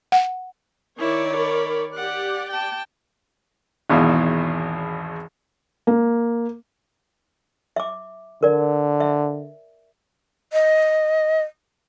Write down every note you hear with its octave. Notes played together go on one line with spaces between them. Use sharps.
F#5
D#3 E4 C#5 D5
A#4 B5
G4 D5 F#5
G5 A5
G#1 E2 B2 E4 F5
A#3
E5 D6
D3 A#4 D5
E5
D#5